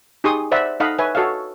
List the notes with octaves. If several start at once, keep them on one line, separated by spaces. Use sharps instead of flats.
D#4 G4 G#4 C6 C#6 D#6
C5 D5 E5 F#5 B5
D#4 A4 D#5 F5 F#5 B5
B4 C#5 E5 G#5
F#4 A4 C#5 D#5 F5